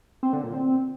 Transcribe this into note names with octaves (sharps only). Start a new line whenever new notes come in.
C4
D3
A#2
C4